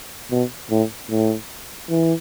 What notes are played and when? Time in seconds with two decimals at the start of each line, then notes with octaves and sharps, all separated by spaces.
0.31 B2
0.71 A2
1.10 A2
1.90 E3